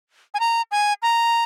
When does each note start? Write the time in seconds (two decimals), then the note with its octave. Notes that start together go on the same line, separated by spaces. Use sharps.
0.34 G#5
0.40 A#5
0.72 G#5
1.02 A#5